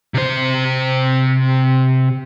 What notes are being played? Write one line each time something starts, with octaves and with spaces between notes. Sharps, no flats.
C3 C5